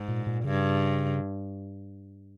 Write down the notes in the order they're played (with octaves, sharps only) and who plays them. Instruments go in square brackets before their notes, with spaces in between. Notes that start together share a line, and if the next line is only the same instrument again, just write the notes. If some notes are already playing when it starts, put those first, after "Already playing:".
Already playing: [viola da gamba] G#2
[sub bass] A#2
A#2
[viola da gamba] G2 [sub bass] C#3